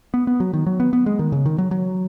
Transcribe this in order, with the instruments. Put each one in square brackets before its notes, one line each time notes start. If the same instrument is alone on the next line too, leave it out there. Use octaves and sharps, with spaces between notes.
[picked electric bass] B3
B3
F#3
D#3
F#3
B3
B3
G#3
D#3
C#3
D#3
F#3
F#3